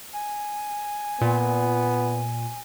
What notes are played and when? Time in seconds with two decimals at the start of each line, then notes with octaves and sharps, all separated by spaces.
0.13 G#5
1.21 A#2 B3